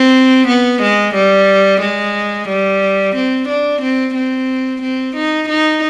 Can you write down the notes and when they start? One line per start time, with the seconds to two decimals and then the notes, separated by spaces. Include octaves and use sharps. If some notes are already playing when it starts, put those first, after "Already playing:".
Already playing: C4
0.47 B3
0.82 G#3
1.15 G3
1.81 G#3
2.48 G3
3.15 C4
3.48 D4
3.82 C4
4.14 C4
4.82 C4
5.16 D#4
5.49 D#4